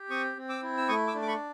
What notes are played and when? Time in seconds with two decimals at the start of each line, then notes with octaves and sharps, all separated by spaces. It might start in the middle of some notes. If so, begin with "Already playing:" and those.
Already playing: G4
0.10 C4 C#6 D#6
0.37 C4
0.49 D6 E6
0.63 E4
0.77 E6
0.88 A3 C#6 D#6
1.07 D6 E6
1.15 D4
1.22 D6
1.27 B5 C#6